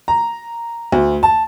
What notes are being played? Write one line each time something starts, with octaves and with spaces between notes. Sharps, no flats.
A#5
D2
A5